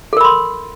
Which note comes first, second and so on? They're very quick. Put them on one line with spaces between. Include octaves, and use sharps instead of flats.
A4 A#4 B5 C6